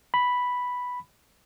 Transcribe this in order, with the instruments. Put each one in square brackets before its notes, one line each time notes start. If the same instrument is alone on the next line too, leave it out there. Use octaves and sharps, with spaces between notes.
[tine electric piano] B5